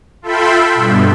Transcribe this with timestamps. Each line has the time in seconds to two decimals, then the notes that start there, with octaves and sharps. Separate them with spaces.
0.22 F4 A4 E5 G5 B5 C6
0.74 G2 B2